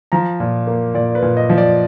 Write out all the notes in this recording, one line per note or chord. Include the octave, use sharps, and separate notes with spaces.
F3 A#5
A#2
A#3
A#2 D5
B4
A#2
D#5
F3
D5